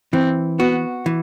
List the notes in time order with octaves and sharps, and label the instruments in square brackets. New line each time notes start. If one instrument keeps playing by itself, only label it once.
[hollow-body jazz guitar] E3 [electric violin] C4
[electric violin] B3 [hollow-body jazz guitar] F#4
[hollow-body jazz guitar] E3